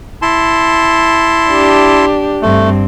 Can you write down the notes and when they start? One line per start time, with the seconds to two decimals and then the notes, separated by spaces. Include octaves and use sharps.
0.22 E4 A5 C6
1.50 D4 G4
2.42 G2 A3 C4